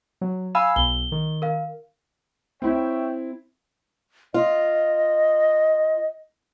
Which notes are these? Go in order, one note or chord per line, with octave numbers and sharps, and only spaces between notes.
F#3
F5 G#5 B5 E6
B1 G7
D#3
A#4 F5
C4 E4 C#5 E5 G5
F4 D#5